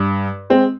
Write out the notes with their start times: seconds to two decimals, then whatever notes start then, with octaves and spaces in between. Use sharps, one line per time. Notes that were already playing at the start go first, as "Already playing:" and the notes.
Already playing: G2
0.50 G#3 C4